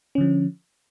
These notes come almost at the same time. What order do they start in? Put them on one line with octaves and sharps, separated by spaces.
C#4 D3 F3